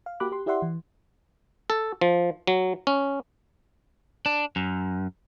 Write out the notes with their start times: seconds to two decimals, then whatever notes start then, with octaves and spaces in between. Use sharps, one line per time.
0.06 F5
0.20 A#3 F#4 G4 B5 D6 F#6
0.32 G4 C6
0.46 E4 G4 D5 E5 F#5 C6
0.62 E3
1.70 A4
2.01 F3
2.47 F#3
2.87 C#4
4.26 D4
4.56 F#2